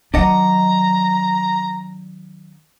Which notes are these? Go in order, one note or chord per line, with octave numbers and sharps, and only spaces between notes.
D#3 F#3 D4 D#5 F#5 A#5